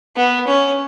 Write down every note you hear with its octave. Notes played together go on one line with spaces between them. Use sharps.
B3
C#4